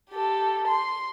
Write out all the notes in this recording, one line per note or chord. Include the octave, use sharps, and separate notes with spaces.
G4 A4
C6